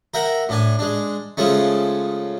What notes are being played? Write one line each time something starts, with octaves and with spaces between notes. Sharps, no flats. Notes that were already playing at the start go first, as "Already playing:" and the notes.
A#4 E5 F#5 G5
A2 D4 G#5
G#3 D4
C#3 F3 G#3 A3 C#4